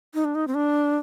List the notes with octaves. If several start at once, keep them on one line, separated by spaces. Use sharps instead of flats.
D#4
D4
D#4
C4
D4